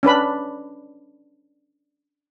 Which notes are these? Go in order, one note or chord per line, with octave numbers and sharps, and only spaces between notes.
C#4 D4 B4 B5